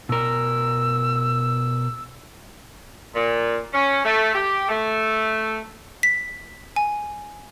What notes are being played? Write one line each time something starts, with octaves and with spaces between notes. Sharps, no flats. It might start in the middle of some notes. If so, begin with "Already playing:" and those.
B2 A#4 E6
A#2
C#4
A3
G4
A3
B6
G#5